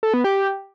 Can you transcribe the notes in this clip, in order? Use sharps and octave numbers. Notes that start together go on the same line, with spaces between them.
A4
B3
G4